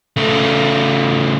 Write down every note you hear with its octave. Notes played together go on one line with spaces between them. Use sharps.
C#3 A3